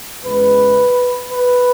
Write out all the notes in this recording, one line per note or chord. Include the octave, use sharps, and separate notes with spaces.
E2 C#3 G#3 B4
B4